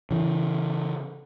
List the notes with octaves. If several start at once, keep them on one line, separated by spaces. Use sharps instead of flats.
C#3 E3